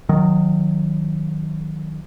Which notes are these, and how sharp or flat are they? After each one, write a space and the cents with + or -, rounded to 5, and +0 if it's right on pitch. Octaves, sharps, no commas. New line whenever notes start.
D#3 +0 F#3 -25